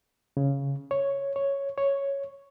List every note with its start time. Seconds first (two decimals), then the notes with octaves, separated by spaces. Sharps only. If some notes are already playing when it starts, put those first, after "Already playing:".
0.37 C#3
0.91 C#5
1.36 C#5
1.78 C#5